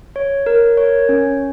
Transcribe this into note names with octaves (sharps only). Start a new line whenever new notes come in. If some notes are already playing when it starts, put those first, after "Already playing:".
C#5
A#4
C#5
C#4